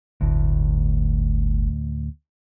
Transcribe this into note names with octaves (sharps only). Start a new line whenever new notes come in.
G1 D2 A2